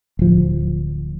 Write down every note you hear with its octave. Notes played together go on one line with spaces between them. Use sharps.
D1 F3